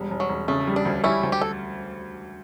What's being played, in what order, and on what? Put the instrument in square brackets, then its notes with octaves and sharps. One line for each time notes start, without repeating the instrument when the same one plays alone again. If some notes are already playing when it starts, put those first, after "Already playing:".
Already playing: [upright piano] E1 G3
E1
[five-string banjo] F#3
[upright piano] E1
[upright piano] C#3 [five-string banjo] A3
[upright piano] G3
[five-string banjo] D4
[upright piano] D2
[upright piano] G3 [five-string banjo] C#4 E4
[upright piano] D2
[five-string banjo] G4
A4